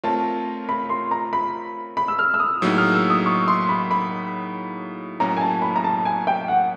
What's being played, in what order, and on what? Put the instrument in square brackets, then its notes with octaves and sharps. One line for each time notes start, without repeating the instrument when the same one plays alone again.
[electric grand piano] A3 C4 F4 A#4 C#5 [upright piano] A5
[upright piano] B5
C6
A#5
B5
B5
E6
F6
E6
D#6
[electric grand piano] A2 F#3 A#3 D#4 G#4 [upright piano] E6
[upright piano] F6
E6
D#6
C#6
C6
B5
B5
[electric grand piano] A2 F#3 A#3 C#4 [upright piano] A#5
[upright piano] G#5
A5
B5
A#5
A5
G#5
G5
F#5